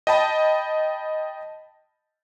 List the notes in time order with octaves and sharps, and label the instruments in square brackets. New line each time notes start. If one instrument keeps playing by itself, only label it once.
[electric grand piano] D#5 G5 A5 B5